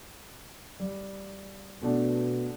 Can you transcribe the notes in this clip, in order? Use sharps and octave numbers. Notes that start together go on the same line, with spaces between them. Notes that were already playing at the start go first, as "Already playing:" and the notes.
G3
B2 A3 B3 D4